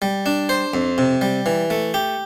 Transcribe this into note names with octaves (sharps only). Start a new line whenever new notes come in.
G3
D4
C5
F2
C3
G3
E3
A3
G4